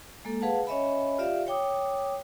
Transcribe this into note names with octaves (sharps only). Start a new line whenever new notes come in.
G#3 A#3 A4
G#4 B4 F5 F#5 A5
C#4 C#5 D#5 E5 G#5 B5
F4 G4 D5 E5 F5
C#5 G5 D6 D#6